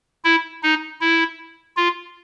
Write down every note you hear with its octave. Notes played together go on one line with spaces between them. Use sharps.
E4
D#4
E4
F4